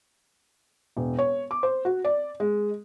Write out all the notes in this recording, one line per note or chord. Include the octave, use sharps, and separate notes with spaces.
E1
C#5
D6
C5
F#4
D5
G#3